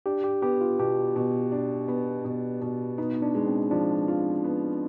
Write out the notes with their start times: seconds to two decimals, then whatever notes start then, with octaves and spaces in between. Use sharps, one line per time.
0.06 D4 G4
0.24 G4
0.42 B3 G4
0.61 F4
0.79 B2 G4
1.16 B2
1.52 D4
1.88 B3
2.25 B2
2.61 B2
2.98 B3 D#4
3.22 D4
3.35 G#3
3.47 C4
3.71 F3 D4
4.08 F4
4.44 B3